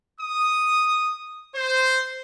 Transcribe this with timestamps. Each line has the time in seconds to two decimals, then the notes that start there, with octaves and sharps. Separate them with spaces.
0.21 D#6
1.55 C5